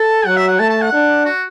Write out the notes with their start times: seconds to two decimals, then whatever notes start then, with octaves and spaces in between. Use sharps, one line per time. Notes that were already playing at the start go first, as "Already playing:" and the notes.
Already playing: A4 A5
0.26 F#3 F#5
0.37 E5
0.48 F#5
0.59 A3 A5
0.70 A5
0.81 F#5
0.93 D4
1.26 F#4